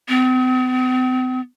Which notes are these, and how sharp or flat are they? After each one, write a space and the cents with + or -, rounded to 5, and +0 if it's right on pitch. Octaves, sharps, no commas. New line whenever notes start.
C4 -45